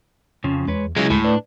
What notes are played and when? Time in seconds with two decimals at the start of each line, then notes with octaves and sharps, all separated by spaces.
0.44 F2 C#3 F3 C#4
0.68 E2 G#3 B4 C#5
0.97 C#3 F#3 G#3 C#4 E4
1.10 D2 A2 G#3 A3
1.24 D4 B4 D5